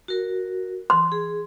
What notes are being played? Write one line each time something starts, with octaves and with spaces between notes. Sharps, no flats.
F#4 A#4
C6
G#4